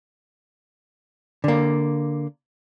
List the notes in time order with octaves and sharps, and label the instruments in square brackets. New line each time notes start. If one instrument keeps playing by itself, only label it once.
[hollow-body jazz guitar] D3 A#3